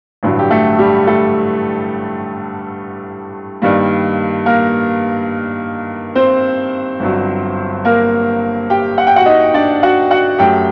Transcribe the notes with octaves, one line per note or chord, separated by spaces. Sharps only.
A1 G2 D3 F#3
G4
A3 A4
G3 G4
A3 A4
G2 D#3 G3 A#3
A#3 A#4
C4 C5
G1 G2 F#3
A#3 A#4
G4 G5
F#5
G5
F#4 F#5
D#4 D#5
D4 D5
F#4 F#5
F#4 F#5
F#2 F#3 A3 G4 G5